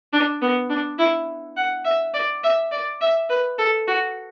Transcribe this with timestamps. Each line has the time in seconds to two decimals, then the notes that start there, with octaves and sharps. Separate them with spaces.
0.13 D4
0.42 B3
0.70 D4
0.99 E4
1.57 F#5
1.85 E5
2.14 D5
2.44 E5
2.72 D5
3.01 E5
3.30 B4
3.58 A4
3.87 F#4